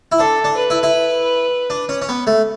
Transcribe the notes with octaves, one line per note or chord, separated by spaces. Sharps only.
E4
D4 A4
D4
B4
E4
E4
D4
C#4
C#4
B3
A3